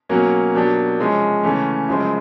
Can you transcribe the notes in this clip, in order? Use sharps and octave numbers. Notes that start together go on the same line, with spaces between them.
B2 F#3 A#3 C#4 F#4
B2 F#3 A#3 D4 G4
C3 F3 G#3 C#4
C#3 E3 A3 C#4
F#2 C#3 F3 G#3 C4